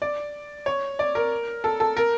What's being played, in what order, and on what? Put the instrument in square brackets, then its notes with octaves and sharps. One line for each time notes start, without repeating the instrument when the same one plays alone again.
[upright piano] D5
C#5
D5
A#4
A4
A4
A#4